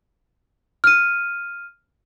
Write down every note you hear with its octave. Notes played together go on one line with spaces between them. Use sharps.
F6 D#7